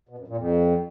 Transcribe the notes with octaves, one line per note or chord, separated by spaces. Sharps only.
B2
F#2
A#2
F2